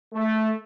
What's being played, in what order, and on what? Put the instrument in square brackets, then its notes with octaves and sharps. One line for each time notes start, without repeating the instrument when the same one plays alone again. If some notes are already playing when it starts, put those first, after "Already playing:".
[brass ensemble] A3